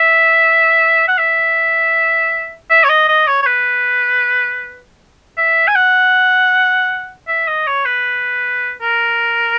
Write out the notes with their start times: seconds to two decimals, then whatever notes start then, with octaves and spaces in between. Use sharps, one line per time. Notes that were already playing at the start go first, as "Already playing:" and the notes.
Already playing: E5
1.08 F#5
1.17 E5
2.70 E5
2.84 C#5
2.89 D#5
3.08 D#5
3.27 C#5
3.42 C#5
3.46 B4
5.37 E5
5.67 G#5
5.75 F#5
7.28 E5
7.48 D#5
7.67 C#5
7.85 B4
8.81 A#4